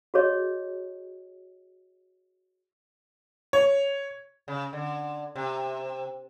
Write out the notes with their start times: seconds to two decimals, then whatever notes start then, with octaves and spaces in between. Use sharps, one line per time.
0.14 F#4 G#4 C#5 D#5
3.53 C#5
4.48 C#3
4.73 D3
5.36 C3